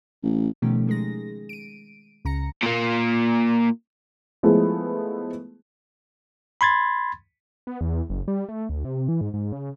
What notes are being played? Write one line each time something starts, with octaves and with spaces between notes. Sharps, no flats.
A1
B2 D#3 F3 A3 C#4 G4
D#3 G#3 G#4 A#6
D7 D#7
C#2 C#3 A#5 A#6 C#7
A#2 A#3
F3 G#3 A3 B3 E4 G#4
B5 C6 G#6 A6
B3
E2
F#1
G3
A3
D2
C3
E3
G#2
G#2
C#3